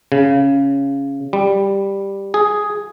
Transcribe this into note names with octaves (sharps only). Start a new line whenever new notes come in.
C#3
G3
G#4